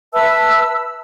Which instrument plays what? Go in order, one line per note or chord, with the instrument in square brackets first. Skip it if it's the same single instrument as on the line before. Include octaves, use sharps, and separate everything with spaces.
[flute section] B4 E5 A5 E6